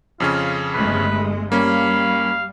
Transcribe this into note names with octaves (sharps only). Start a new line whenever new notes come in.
F2 C#3 C#4 F4
G1 G#3 A3 B4
G3 A#3 C#4 F5 B5